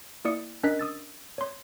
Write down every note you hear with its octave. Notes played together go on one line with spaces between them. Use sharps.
A#3 E4 D5 D#6 C#7
C#4 D4 A#4 D#5 F#6 B6
D#6 E6 A6
C#5 C6